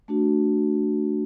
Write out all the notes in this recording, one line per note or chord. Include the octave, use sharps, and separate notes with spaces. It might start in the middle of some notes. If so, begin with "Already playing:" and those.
A3 D4 F#4